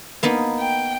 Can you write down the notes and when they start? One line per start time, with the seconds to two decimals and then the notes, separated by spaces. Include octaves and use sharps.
0.23 A#3 B3 D#4
0.59 G5